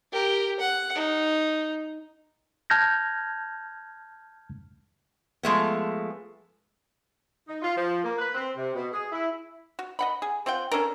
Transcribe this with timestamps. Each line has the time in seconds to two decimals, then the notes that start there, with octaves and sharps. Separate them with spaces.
0.12 G4 A#4
0.60 F#5
0.95 D#4
2.70 A5 F6 G6 G#6 A#6
5.43 F3 G#3 A3 B3
7.48 D#4
7.62 F4
7.76 F3
8.03 A#3
8.18 B4
8.34 C4
8.56 C3
8.75 B2
8.92 G#4
9.12 E4
9.79 F#4
9.99 D#5 F#5 B5
10.22 G#4
10.46 C4 F4 F#5 G5
10.72 C#4 D4 A4 A#4